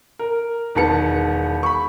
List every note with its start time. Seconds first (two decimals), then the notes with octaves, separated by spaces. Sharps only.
0.19 A#4
0.75 E1 D#3 B3 A5 C#7
1.63 B5 C#6